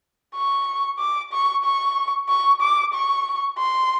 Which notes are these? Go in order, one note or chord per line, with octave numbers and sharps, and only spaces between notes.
C#6
D6
C#6
C#6
C#6
D6
C#6
C6